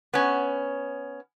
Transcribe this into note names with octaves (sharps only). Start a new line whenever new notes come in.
B3 C#4